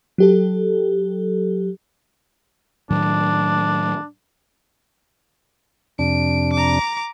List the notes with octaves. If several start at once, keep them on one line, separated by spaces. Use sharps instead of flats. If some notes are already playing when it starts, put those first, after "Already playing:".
F#3 G4 A4
A2 D#3 F#3 D4
F2 C3 D4 D7
A#5 D6